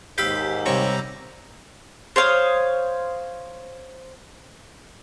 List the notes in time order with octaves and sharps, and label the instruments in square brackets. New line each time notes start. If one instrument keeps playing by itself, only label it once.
[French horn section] D#2 G#2 [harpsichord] G4 F5 B5 [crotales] E6 G6
[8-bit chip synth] C3 G3 A#5 [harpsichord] C4 C#5
[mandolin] C5 C#5 F5 D#6